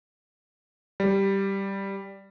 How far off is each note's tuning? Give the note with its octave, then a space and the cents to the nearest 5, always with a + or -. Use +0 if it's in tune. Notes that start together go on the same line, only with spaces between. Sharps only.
G3 +0